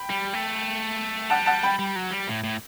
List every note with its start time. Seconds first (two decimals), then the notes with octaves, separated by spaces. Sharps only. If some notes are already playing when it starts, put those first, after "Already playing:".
Already playing: G5 B5
0.10 G3
0.33 A3
1.30 G3 F#5 A5
1.46 F#5 A5
1.63 G5 B5
1.79 G3
1.96 F#3
2.11 G3
2.28 A2
2.44 A2